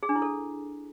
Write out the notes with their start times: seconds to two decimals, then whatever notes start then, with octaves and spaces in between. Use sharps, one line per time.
0.03 G#4
0.09 D4
0.15 E4
0.22 A4